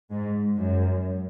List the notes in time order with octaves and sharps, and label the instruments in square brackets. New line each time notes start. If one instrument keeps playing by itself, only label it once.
[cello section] G#2
F#2